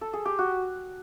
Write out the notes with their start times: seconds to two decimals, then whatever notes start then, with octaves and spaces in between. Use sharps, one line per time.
0.01 A4
0.13 G#4
0.25 G4
0.39 F#4